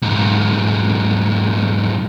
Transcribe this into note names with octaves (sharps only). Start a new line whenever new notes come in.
B1 G#2